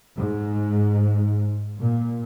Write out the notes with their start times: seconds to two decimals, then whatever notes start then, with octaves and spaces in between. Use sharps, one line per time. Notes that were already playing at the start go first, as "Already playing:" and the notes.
0.17 G#2
1.79 A#2